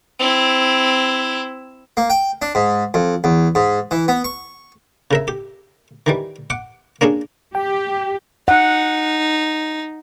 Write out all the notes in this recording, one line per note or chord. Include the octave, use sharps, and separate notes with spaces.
C4 E4
A#3
G5
D4
G#2
F2
E2
G#2
E3
B3
C#6
C#3 A#4 E5
G4
D#3 E3 G3
F#5 D6
A#3 C#4 D4 G#4
G4 G5
D#4 F#5